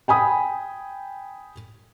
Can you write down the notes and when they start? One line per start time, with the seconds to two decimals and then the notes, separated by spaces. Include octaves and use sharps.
0.08 G5 G#5 B5 D#6